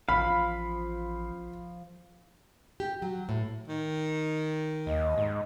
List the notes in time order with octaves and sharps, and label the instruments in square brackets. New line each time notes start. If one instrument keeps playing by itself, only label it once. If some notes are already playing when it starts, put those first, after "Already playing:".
[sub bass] A1 [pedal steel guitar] F3 F5 [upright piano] B5
[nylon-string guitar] G4
F#3
A2
[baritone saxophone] D#3
[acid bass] D#2 [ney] D#5
[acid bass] G#2